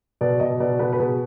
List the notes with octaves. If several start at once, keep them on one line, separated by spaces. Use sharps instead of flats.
B2 D5
B2 D#5
B2 D5
B2 B4
B4
B2 G#4